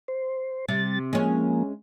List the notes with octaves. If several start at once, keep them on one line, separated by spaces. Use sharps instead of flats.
C5
C3 G3 A6
F3 G#3 A#3 C#4